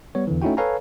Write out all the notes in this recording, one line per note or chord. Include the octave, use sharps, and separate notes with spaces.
G3 B3 C#5
E2 D3 E3
A3 C#4 D#4 E4 F#4 G5
A4 B4 C#5 F5 G#5 A#5